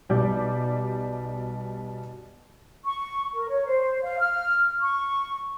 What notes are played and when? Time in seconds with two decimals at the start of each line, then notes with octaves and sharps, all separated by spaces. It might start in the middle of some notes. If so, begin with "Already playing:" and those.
0.09 B1 B2 G3 D5 D6 G6
2.85 C#6
3.34 A#4
3.48 C#5
3.66 C5
4.03 F5
4.19 F6
4.81 C#6